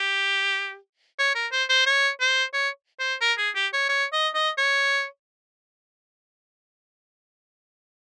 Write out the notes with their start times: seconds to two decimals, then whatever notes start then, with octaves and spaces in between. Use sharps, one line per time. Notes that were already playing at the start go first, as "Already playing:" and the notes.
Already playing: G4
1.19 C#5
1.35 A#4
1.52 C5
1.70 C5
1.86 C#5
2.21 C5
2.54 C#5
2.99 C5
3.21 A#4
3.38 G#4
3.55 G4
3.73 C#5
3.89 C#5
4.13 D#5
4.34 D#5
4.58 C#5